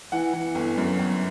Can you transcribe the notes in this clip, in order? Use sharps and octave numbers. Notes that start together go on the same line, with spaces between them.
E3 F#5
E3
G1
F#2
G1